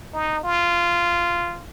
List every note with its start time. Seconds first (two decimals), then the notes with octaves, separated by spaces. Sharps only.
0.14 D#4
0.44 F4